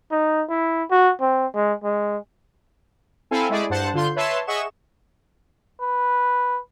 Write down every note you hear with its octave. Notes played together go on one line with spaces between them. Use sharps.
D#4
E4
F#4
C4
G#3
G#3
C4 E4 A4 F5 G#5
G#3 A3 E4 G#4 D5
G2 C5 F#5 A5
D3 F4 C6 G6
B4 C#5 E5 A5 C6
G#4 D#5 E5 F#5 C#6 E7
B4